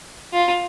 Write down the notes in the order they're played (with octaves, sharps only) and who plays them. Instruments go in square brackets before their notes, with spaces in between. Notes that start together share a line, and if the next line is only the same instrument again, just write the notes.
[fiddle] F4